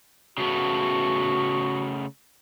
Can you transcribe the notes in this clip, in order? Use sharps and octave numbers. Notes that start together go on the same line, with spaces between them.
C#3 A3 B3 F#4